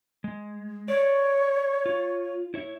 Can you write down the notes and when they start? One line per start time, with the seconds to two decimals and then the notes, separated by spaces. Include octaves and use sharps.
0.24 G#3
0.88 C#5 D5
1.86 F4
2.54 E4 C#5 E5